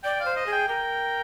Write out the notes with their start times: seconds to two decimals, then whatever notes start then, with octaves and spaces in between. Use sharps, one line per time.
0.03 D5 G5
0.20 C5 F5
0.36 D#5
0.46 G#4
0.52 G5
0.68 A#4 G5